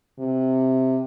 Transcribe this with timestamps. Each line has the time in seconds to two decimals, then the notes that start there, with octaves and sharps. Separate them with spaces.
0.19 C3